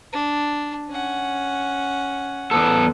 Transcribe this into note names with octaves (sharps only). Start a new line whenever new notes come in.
D4
C#4 F#5
E2 B3 A4